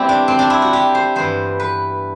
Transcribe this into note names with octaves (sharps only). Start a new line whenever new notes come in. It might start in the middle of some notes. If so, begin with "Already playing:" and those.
Already playing: G3 B3 C4 E4 G4
D4
C4
D4
E4
F#4
G4
C5
G2 E3 B3 C5
B4